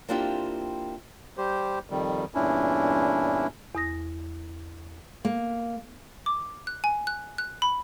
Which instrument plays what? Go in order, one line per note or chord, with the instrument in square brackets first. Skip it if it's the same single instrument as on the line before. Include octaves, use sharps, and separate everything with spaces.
[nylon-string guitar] A#3 C4 D4 E4 F4 G4
[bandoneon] G3 G4 C5
F2 D#3 G3
E2 G2 A#2 C#4 D4 E4
[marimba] E2 D#6 A#6
[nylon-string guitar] A#3
[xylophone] D6
F#6
G#5
F#6
F#6
B5